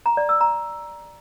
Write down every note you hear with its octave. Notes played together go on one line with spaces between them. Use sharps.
A#5
D5
E6
A#5